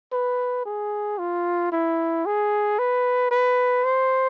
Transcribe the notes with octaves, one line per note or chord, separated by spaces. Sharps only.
B4
G#4
F4
E4
G#4
B4
B4
C5